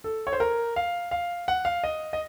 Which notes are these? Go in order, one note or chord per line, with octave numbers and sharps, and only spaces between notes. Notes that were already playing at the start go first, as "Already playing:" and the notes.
A4
C#5
C5
A#4
F5
F5
F#5
F5
D#5
D#5